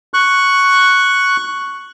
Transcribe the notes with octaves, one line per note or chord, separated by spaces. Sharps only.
C#6 F#6